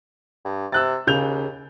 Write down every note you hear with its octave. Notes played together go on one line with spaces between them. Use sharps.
G2
C3 E6 F#6 A6
D#2 C#3 G6 F7